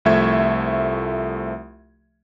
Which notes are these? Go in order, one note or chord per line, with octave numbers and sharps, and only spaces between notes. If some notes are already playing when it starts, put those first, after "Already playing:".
C2 F3 A3 E5 C#6 G#6